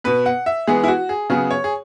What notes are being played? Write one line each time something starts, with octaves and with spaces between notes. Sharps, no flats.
B2 B3 B4
F#5
E5
E3 G#3 B3 G#4
E4
F#4
G#4
C#3 F#3 B3 G#4
C#5
G#4